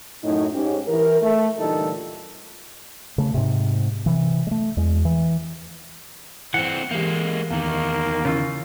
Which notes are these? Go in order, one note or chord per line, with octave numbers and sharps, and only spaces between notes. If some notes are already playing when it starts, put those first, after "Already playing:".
F#2 A2 D#4
G#2 C#4 G4
E3 A#4
A3
A#2 D3 E3 G3 D#4 A4
C#3 A3
G#2 C3
C3 E3
G#3 A3
E2 G#3
E3
E3 C4 F#5
E3 G#3 A#3 G4
E2 D#3 A#3
C#3 C#4 E4 F4